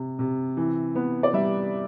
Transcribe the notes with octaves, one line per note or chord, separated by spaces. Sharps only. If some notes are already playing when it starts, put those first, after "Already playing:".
Already playing: C3
C3
E3
B3
D5
G3 E5